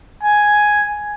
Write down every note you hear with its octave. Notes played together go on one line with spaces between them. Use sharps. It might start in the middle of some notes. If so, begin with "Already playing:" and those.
G#5